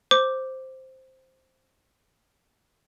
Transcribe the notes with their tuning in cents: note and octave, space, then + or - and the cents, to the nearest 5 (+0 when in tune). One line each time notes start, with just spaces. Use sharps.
C5 +0 D6 +0